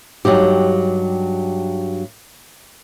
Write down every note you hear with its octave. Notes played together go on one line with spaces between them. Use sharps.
G2 F#3 D#4 G4